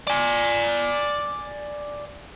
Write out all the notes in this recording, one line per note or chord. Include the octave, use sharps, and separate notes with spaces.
D5 G#5